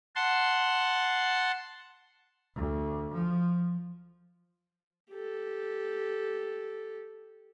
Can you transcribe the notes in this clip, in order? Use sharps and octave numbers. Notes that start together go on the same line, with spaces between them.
F#5 A5 C6
D2
F3
G4 A4